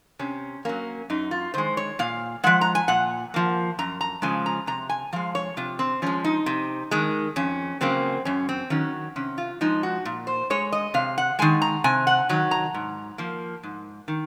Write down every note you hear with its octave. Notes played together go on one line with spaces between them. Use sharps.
C3 C#4
F#3 A#3 C#4
F#2 D#4
F4
D#3 G#3 C5
C#5
A#2 F5
F3 G#3 F#5
A#5
G#5
A#2 F#5
F3 A#3
F#2 A#5
A#5
C#3 F3 G#3 G#5
A#5
C3 A#5
G#5
F3 G#3 F5
C#5
C3 F4
C4
F3 G#3 C#4
D#4
C3
D#3 G#3
F2 C#4
C#3 F#3 A#3 C4
F#2 C#4
C4
D#3 F#3 C#4
C3 C#4
F4
F3 G#3 D#4
F#4
A#2
C5
G#3 C#5
D#5
C3 F5
F#5
D#3 G#3 G#5
A#5
C3 G#5
F#5
D#3 F#3
A#5
G#2
F3 A#3
G#2
D#3